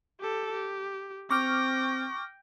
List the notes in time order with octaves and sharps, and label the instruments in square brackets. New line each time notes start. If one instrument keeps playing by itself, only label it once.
[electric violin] G4 A4
G4
[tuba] C4 [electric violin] G5 A#6 [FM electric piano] C#6 D6 F6